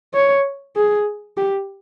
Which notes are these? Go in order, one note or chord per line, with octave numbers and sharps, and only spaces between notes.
C#5
G#4
G4